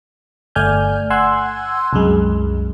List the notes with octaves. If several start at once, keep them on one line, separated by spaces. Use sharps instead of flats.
G1 A3 D5 G#5 F6 G6
F#5 G#5 C6 E6 F#6 G#6
C2 F#2 G#3